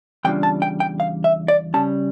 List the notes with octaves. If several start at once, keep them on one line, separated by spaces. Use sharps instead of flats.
E2 C#3 G3 D4 F4 G5
A5
G5
G5
F5
E5
D5
C#3 G3 C#4 A5